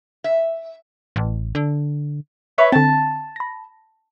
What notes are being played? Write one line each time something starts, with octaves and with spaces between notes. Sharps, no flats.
E5
A1
D3
B4 C#5 E5
D3 C4 A5
B5 A#6